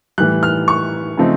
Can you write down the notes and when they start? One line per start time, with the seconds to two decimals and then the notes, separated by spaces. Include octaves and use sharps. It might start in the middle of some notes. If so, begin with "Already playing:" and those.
0.18 A2 E3 G3 F#6
0.43 F6
0.68 C#6
1.17 C#3 F3 A3 C4 D#4